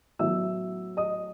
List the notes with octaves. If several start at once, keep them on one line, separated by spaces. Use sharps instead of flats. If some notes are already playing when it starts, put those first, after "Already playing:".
A2 F#3 B3 E5 E6
D#5 D#6